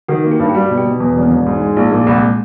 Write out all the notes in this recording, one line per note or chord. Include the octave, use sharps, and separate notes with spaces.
D#3 F#4
A#3
G4
G2
G4
G3 F#4
B2
G4
B2
E2
E1
B3
E1
G#2
G#3
A#1
A#2 A#3
C2 G#3
G#3